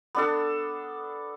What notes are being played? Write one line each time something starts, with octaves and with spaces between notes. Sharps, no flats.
B3 D4 A4